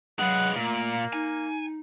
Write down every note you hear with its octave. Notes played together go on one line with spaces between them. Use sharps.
F#3 G#3 B4 F#5
A#2 A3 A#3
D#4 G#5